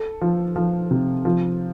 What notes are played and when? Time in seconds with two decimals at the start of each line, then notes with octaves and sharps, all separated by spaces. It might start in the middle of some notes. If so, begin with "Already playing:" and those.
Already playing: A4
0.21 F3
0.56 F3
0.91 C3
1.25 F3